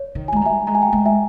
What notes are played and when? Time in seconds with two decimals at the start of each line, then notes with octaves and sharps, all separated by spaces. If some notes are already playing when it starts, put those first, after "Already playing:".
Already playing: C#5
0.15 D#3
0.28 G#5
0.32 G#3
0.37 A#5
0.41 G3 E5 G#5
0.67 G#3 A#5
0.75 G#5
0.82 G5 A#5
0.93 G#3
1.06 E5 G#5